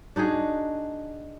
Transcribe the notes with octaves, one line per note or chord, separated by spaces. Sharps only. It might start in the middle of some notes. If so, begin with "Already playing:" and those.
D4 D#4 F#4 G#4